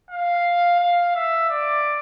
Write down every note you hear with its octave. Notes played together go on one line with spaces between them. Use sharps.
F5
F5
E5
D5